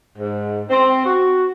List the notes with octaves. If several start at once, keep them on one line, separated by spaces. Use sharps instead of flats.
G#2
C4
F#4